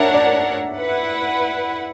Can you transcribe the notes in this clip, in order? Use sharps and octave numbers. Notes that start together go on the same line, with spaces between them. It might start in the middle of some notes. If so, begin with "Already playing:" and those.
Already playing: D4 A#4 C#5 E5 F#5
D5
E4 B4 F#5